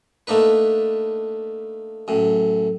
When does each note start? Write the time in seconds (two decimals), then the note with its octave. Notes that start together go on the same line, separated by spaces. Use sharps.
0.27 A3 A#3 D4 D#4 B4
2.08 F#2 A2